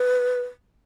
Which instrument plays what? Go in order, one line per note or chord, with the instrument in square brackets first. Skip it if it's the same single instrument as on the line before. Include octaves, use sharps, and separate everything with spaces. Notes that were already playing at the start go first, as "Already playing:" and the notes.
Already playing: [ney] B4